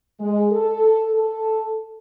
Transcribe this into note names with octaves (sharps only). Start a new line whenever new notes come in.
G#3
A4
A4